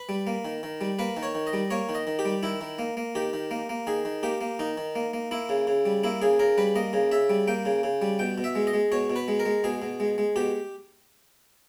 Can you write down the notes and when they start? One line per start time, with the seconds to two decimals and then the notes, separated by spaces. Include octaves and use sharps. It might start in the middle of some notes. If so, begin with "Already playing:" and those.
Already playing: B4
0.09 G3
0.27 A#3
0.45 D#3
0.63 D#3
0.81 G3
0.99 A#3 B4
1.17 D#3
1.23 C#5
1.35 D#3
1.47 D#5
1.53 G3
1.71 A#3 C#5
1.89 D#3
1.95 D#5
2.07 D#3
2.19 G4
2.25 G3
2.43 D#3 E4
2.61 D#3
2.79 A#3
2.97 A#3
3.15 D#3 G4
3.33 D#3
3.51 A#3
3.69 A#3
3.87 D#3 G#4
4.05 D#3
4.23 A#3 G4
4.41 A#3
4.59 D#3 D#4
4.77 D#3
4.95 A#3
5.13 A#3
5.31 A#3 E4
5.49 C#3
5.67 C#3
5.86 G3
6.04 A#3 E4
6.21 C#3 G#4
6.39 C#3 A#4
6.58 G3 B4
6.76 A#3 D#5
6.93 C#3
7.11 C#3 E5
7.30 G3
7.48 A#3 G5
7.65 C#3
7.83 C#3
8.02 G3
8.19 B2 G5
8.38 B2
8.44 E5
8.56 G#3
8.67 D#5
8.74 G#3
8.92 B2 C#5
9.10 B2
9.16 B4
9.28 G#3
9.40 A#4
9.46 G#3
9.64 B2 G#4
9.82 B2
10.00 G#3
10.18 G#3
10.36 B2 G4